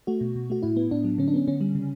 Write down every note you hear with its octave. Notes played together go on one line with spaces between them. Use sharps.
A3 F#4
B2
B2
A3 F#4
A2 E4
B3
A2 D4
F#3
D3 C#4
D4
B3 C#4
D3 C#4
G3
C#3